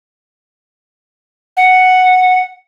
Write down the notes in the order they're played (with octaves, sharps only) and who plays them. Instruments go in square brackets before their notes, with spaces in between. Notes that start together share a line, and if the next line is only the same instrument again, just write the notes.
[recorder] F#5